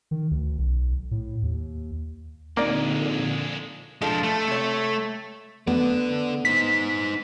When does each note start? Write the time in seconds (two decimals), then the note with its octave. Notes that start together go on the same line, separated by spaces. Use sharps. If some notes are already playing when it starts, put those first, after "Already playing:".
0.11 D#3
0.31 D2
0.58 B1
1.11 A2
1.43 D#2
2.57 G#1 F2 A#2 D3 G#3 A#3 D5
4.02 F3 G#3 D4 F4 A4
4.23 A3
4.48 C3 C#5
5.67 B3 A4 D5
6.45 D#4 C5 B6